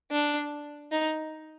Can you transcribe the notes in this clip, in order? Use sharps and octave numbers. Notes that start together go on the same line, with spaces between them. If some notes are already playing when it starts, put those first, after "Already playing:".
D4
D#4